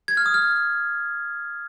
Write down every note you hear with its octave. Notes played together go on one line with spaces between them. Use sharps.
G#6
F6
D#6
F6